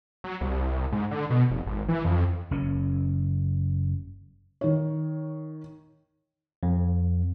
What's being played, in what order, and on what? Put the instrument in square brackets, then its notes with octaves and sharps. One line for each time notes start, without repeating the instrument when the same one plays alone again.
[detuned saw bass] F#3
C2
C2
G#2
D3
B2
F1
G#1
E3
F2
[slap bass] F#1 F#2 C#4
[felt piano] D#3 C#5
[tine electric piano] F2